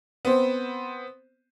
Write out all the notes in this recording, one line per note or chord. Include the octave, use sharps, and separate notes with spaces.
B3 C4 C5